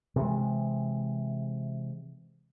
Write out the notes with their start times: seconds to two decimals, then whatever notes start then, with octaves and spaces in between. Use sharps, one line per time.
0.16 C3 E3 G#3